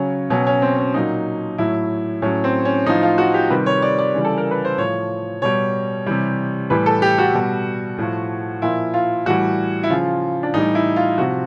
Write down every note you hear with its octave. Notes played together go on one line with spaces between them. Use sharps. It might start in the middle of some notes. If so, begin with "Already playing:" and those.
Already playing: C#3 F#3 C#4
B2 F#3 C#4
C#4
C4
C#4
A#2 F#3 D#4
A2 F#3 E4
A2 F#3 C#4
C4
C#4
A2 F3 D#4
F4
F#4
G4
C3 D#3 G3 B4
C#5
D5
D5
C#3 E3 G3
A4
A#4
B4
C5
A2 F3 C#5
B2 G3 C#5
C3 E3 G3
A2 E3 G3 B4
A4
G4
F#4
B2 G3
A2 F3
A#2 F3 E4
F4
A2 E3 G3 F#4
E4
C#3 F3 F4
D4
A2 E3 G3 D#4
E4
F4
C3 F3 F#4